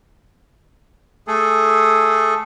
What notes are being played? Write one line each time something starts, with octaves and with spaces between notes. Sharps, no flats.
A3 G#4 A4